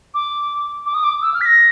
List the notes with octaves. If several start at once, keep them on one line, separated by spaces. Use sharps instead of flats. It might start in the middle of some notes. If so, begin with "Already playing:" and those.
D6
D6
D#6
D6
E6
F6
B6
A#6